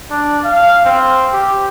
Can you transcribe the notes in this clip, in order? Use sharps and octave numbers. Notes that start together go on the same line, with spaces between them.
D4
F5
C4
G4